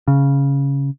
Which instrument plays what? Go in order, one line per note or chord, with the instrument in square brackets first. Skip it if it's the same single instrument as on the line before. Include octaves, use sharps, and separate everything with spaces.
[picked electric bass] C#3